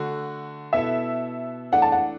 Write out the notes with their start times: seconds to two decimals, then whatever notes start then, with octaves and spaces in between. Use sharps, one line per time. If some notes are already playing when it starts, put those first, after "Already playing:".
Already playing: D3 A3 F#4
0.73 B2 B3 E4 A4 E5
1.72 E3 A3 D4 A4 F#5
1.82 A5
1.92 F#5